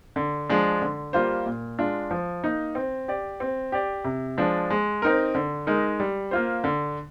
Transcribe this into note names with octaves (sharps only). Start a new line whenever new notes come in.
D3
F3 G#3 D4
D3
G3 A#3 F4 C5
A#2
G#3 D4 F4
F3
A#3 D#4
C4
G4 D5
C4
G4 D5
C3
F3 G#3 D4
G#3
C4 D#4 A#4
D3
G#3 D#4 A#4
G3
A#3 F4 C5
D3